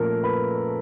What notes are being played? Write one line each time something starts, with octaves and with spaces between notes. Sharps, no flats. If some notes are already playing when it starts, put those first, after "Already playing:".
Already playing: A#2 F3 A3 C#4 A4 A#4 A#5
B4 B5